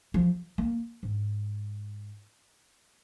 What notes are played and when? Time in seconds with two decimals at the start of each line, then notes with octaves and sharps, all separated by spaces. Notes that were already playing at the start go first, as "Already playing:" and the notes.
0.14 F3
0.58 A#3
1.03 G#2